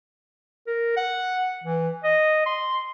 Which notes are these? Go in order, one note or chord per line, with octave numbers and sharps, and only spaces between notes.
A#4
F#5
E3
D#5
C6